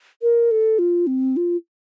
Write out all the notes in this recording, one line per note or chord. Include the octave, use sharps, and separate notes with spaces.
A#4
A4
F4
C4
F4